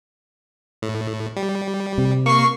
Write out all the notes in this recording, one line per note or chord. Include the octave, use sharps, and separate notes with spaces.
A2
G3
C3
A#3 C#6 C7